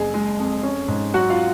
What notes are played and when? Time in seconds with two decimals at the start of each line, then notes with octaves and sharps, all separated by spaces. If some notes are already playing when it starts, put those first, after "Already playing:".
Already playing: F#1 G#4 G#5
0.14 G#3
0.39 F2
0.63 C#4
0.88 G#2
1.14 F#3 F#4 F#5
1.30 F4 F5